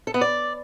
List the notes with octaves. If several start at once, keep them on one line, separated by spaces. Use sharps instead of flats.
A4
B3
D5